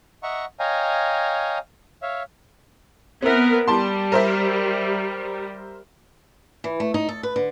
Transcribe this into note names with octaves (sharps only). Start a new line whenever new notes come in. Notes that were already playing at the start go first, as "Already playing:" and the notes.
D#5 E5 F#5 A#5 C#6
C#5 D#5 F5 G5 G#5 A#5
C#5 E5 F5
B3 C4 A#4 E5
G3 A5 C6
A#4 C5 E5
E3
A3
D#4
A4
B4
D3